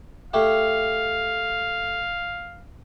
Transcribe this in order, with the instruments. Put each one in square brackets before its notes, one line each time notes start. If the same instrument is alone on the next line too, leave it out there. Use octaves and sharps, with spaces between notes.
[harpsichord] A3 E4 G4 [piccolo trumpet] F5